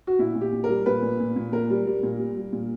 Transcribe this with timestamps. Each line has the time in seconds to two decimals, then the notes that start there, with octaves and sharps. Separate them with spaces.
0.07 F#4
0.19 A#2 E4
0.35 A#2
0.41 G4
0.52 A#2
0.64 A#4
0.69 G3
0.86 A#2 B4
1.02 A#2
1.20 A#2
1.36 A#2
1.52 A#2 A#4
1.70 G3
1.87 G3
2.03 A#2
2.19 G3
2.37 G3
2.53 A#2